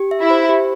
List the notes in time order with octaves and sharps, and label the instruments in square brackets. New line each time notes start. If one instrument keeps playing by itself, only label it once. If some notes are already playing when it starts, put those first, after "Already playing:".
Already playing: [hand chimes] G4
E5
[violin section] E4
[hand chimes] C5
G4